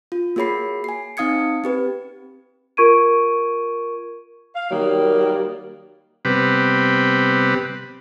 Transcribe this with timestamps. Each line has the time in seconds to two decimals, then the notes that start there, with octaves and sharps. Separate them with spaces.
0.12 F4
0.36 A#3 F#4 G#4 C#5 B5 C7
0.84 G#5 C7
1.17 C4 D#4 F5 D#6 G#6 C#7
1.64 C4 G4 B4
2.77 F4 A#4 C#6 G#6 D7 D#7
4.55 F5
4.70 D#3 F#3 G3 A#3
6.25 C3 G3 B3 C4 G4 B4